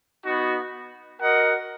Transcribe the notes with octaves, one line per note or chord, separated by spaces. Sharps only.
B3 D#4 F#4
F#4 A#4 D#5 F#5